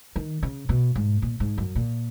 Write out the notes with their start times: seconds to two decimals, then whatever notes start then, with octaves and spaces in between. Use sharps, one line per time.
0.16 D#3
0.43 C#3
0.69 B2
0.96 G#2
1.22 A#2
1.40 G#2
1.58 F#2
1.75 A#2